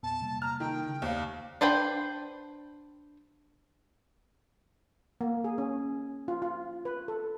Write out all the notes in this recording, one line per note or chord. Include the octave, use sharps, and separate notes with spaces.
E2 A#2 B3 A5
C3 G3 A#3
A#5 F6
D#3 G5
C#3
D#2 C5 D5 F5
D4 B4 C5 G5
A#3
G#4
C#4
F4
F4
B4
A4